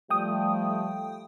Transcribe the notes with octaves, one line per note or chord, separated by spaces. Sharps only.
F3 G3 A3 G5 D#6